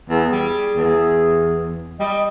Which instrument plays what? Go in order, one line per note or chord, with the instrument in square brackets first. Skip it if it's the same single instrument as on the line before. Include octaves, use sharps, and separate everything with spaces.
[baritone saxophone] E2 [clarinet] G#4
[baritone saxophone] G3
E2
[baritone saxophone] G3 [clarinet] D#5